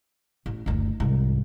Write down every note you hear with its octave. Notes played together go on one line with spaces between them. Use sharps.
A1
F#1 D2
C2 G#2